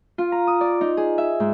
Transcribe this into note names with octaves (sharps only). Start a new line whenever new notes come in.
F4
A#5
D#6
D5
D#4
G#4
E5
G#2